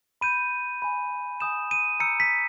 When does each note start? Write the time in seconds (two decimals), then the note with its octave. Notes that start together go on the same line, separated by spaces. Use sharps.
0.21 B5 G6 D#7
0.82 G#5 B5 G6
1.40 G#5 D#6 G6 E7
1.71 D#7
2.00 A#5 E6 G6 C#7
2.20 B6